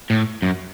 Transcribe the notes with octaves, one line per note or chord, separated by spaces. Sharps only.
A2
F#2